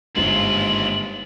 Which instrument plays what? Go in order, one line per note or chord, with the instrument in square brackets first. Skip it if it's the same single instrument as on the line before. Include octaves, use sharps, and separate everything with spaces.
[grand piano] G1 G#2 E7 [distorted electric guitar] D#2 F4 [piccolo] F#7